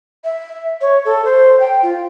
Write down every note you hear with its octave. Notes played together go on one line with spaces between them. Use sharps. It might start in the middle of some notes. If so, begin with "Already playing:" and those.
E5
C#5
A4
C5
G5
F4